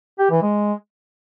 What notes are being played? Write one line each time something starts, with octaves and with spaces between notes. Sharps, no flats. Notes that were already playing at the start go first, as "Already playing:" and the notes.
G4
E3
G#3